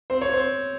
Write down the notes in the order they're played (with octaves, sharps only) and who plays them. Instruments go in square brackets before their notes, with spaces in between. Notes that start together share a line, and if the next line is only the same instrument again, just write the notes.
[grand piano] C4 C5
C#5
C4 C5